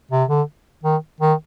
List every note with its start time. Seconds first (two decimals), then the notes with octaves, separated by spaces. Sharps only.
0.11 C3
0.29 D3
0.84 D#3
1.21 D#3